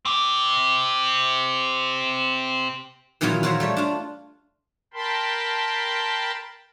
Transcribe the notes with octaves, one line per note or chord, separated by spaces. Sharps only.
C4 G4
A#2 D#3 E3 F#3 B3 F4
F4 F#4 A#4 C5 C#5 E5
G3 A3 C#5
D4 F4
A#4 G5 A5 B5 C6